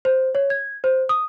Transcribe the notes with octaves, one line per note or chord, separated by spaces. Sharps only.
C5
C#5
G#6
C5
D#6